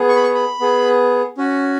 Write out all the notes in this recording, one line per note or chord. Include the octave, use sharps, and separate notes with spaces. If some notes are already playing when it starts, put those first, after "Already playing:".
Already playing: B3 G#4
C#6
B5
C#6
B5
B3 G#4
C#4 F#4